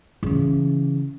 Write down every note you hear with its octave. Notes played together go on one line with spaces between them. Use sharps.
C#3 E3